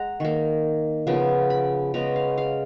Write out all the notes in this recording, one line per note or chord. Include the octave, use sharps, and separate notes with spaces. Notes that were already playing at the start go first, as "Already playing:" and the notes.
Already playing: G#3 F#5 A#5
D#3 A#3
C#3 F3 B3
B5
C#3 G#3 B3 A#5
F5
F5